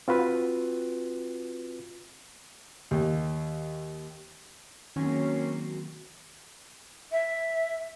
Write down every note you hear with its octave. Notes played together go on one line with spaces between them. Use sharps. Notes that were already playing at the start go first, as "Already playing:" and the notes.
C4 F4 F#4 B4
D#2
C3 D#3 F#3 A#3 C4 C#4 F#4
E5